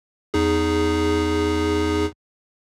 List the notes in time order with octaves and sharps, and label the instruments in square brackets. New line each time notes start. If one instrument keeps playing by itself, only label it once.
[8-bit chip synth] E2 D#4 G#4